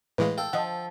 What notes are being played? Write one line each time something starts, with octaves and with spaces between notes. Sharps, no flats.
A2 E3 G#3 B4 F5
A4 F5 G5
F3 D#5 F#5